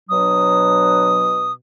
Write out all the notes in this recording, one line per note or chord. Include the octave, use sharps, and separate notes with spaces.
B2 F#3 D4 D#6